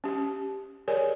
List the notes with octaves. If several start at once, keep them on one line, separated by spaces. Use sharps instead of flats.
C#4 G4
G4 G#4 A#4 C#5 D5 G#5